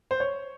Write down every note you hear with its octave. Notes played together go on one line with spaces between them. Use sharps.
C5
C#5